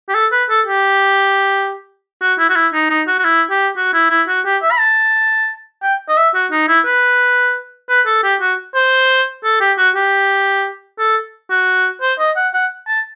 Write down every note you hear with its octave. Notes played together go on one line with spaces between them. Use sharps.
G4
A4
B4
A4
G4
F#4
E4
F#4
E4
D#4
D#4
F#4
F#4
E4
G4
F#4
E4
E4
F#4
G4
E5
B5
A5
G5
D#5
E5
F#4
D#4
E4
B4
B4
A4
G4
F#4
C5
A4
G4
F#4
G4
A4
F#4
C5
D#5
F#5
F#5
A5